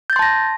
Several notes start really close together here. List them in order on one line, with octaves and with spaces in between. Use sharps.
G6 A6 C6 A5 A#6